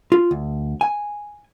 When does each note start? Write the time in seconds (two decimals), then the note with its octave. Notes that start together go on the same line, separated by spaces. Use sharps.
0.12 F4
0.31 D2
0.81 G#5